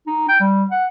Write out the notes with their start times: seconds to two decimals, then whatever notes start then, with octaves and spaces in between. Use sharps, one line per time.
0.07 D#4
0.29 G5
0.40 G3
0.71 F#5